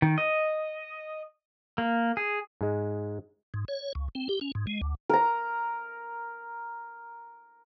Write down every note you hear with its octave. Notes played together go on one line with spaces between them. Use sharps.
D#3
D#5
A#3
G#4
G#2 G#3
G#2
C#5
C#2
C4
G4
C#4
G#2
G#3
D2
A#4 A#5